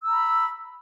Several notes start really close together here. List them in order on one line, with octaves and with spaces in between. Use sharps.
E6 A#5 B5